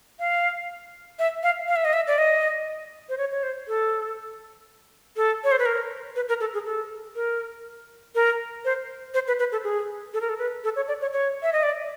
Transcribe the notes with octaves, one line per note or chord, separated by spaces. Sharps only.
F5
E5
F5
F5
E5
D#5
E5
D5
D#5
C5
C#5
C#5
C5
A4
A4
C#5
C5
B4
A#4
B4
A#4
A4
G#4
A4
A#4
A#4
C5
C5
B4
B4
A4
G#4
A4
A#4
A4
B4
A4
C#5
D5
C#5
C#5
E5
D#5
D5